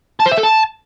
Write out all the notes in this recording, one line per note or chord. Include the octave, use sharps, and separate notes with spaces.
A5
C5
E5
A4
A5